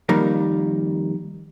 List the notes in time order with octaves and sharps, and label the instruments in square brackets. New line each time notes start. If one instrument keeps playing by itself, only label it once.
[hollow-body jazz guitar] F2 D#3 G3 A#3